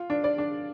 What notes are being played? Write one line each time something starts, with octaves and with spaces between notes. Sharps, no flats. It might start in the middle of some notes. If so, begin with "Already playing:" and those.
Already playing: F4
D4
D5
D4